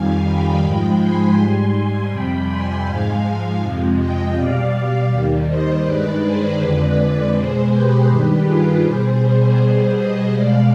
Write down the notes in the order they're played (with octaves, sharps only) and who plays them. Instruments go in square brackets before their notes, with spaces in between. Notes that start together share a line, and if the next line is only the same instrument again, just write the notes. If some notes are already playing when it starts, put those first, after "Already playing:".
Already playing: [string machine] F2 D#3 G3 F5 G#5
G5 B5
G#2 F3 G#3
G#5 C6
G#2 G3 G#5 C6
F2 C3 G3 G5 B5
G#5 C6
G#2 F3 G#3 F5 G#5
F2 C3 F3 G#3
D#5 G5
B2 G3 D5 F5
D#2 D#3 G3
C5 D#5
G2 D#3 G#3 B4 D5
G#4 C5
F2 D3 G#3 B4 D5
B2 G#3 G#4 C5
G4 B4
G2 D#3 G3
F4 G#4
B2 G3 G#4 C5
G#4 C5
B2 G3 G#4 C5
C5 D#5
B2 G#3 D5 F5